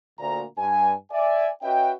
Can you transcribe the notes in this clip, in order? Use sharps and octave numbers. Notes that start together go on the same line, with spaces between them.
D2 A#2 A#5
G2 G#5
D5 E5 G#5
C#4 F#4 B4 D#5 E5 G5